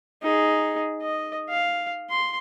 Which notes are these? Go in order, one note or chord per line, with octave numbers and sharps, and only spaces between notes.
D#4 G#4
D#5
F5
C6